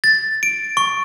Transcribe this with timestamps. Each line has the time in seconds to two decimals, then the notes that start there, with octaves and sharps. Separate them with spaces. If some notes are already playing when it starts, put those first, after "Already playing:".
0.04 A6
0.43 D7
0.77 C#6